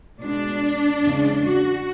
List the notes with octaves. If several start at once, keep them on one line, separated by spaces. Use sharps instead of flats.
B2 G#3 D4
E2 C#3 G#3
F#4